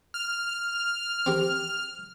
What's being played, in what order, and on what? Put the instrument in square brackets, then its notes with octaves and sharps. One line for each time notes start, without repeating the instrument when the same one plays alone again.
[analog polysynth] F6
[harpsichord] C4 G4 A#4